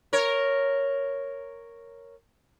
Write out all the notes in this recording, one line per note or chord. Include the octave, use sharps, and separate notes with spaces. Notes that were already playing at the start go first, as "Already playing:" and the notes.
A#4 C#5